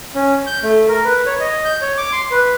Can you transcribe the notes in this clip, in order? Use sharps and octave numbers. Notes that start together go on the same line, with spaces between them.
C#4
G6
A3
A#4
B4
C#5
D#5
G6
C#5
D6
C6
B4